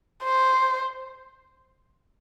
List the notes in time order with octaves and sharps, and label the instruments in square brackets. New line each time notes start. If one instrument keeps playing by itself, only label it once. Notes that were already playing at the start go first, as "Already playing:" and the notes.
[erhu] C5